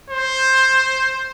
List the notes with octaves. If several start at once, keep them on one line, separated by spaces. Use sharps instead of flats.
C5